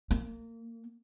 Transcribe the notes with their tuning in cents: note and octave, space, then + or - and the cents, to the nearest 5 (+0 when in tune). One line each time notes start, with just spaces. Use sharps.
A#3 -25